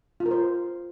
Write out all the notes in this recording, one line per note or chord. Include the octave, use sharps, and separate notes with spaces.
F4
A#4
C5